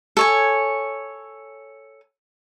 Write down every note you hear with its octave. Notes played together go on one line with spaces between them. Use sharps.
A4 C#5 G#5